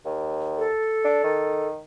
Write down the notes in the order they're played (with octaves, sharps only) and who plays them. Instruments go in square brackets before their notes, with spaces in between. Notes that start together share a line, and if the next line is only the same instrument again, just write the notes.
[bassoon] D#2
[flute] A4
[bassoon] D4
D#3